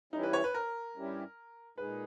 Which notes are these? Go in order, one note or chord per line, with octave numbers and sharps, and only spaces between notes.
E3 G3 C#4 D#4 E4
B4
C#5
B4
A#4
G2 G3 C#4 E4 G4
A#2 G#3 D#4 G#4 B4